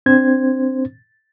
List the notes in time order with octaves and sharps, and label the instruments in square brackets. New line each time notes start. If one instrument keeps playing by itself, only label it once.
[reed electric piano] C4 D4 C5 G#6